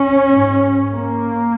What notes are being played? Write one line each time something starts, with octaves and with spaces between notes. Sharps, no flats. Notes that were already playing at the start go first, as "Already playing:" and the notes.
Already playing: C#4
G#2
A#3